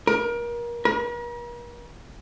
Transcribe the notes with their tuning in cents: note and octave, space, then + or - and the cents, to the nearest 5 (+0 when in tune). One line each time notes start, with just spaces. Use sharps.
A#4 +30
A#4 +45